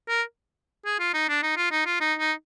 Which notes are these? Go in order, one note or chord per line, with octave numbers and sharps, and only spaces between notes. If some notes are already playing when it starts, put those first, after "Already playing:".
A#4
G#4
F4
D#4
D4
D#4
F4
D#4
F4
D#4
D#4